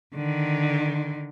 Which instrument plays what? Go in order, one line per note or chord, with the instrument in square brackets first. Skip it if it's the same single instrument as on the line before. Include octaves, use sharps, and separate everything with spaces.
[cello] D3 D#3